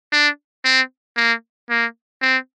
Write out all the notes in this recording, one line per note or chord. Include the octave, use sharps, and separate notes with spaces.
D4
C4
A#3
A#3
C4